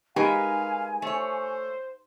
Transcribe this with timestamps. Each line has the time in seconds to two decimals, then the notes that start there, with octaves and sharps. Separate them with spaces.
0.16 G#3 D#4 G4 A#4 B4 F5 G5 G#5
1.02 A3 C5 C#5